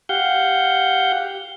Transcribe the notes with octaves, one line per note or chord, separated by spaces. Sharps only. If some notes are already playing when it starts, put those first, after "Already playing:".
G4 F5 F#5 G6